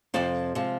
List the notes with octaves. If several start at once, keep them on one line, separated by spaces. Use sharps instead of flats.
F2 C3 F3 C5 D5
C3 F3 G#3